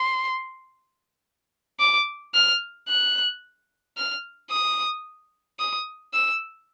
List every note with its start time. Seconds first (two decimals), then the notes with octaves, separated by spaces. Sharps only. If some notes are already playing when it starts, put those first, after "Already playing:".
Already playing: C6
1.80 D6
2.34 F6
2.89 F#6
3.97 F6
4.51 D#6
5.59 D#6
6.14 E6